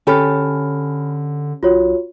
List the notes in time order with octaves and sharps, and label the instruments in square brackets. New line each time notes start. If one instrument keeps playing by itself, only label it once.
[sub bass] D3 [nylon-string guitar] C#4 G4 A4 [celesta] G#5 B5 F6
[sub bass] B1 [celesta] F4 F#4 C#5